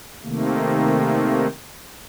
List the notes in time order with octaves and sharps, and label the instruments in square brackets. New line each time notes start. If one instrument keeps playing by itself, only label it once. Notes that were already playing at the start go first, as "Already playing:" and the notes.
[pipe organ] C3 D#3 A3 A#3